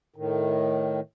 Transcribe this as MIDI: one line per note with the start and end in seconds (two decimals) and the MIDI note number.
0.16 1.00 45
0.16 1.00 51